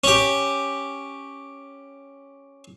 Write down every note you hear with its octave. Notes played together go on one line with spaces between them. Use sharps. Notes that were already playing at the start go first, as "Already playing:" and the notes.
C#4 G4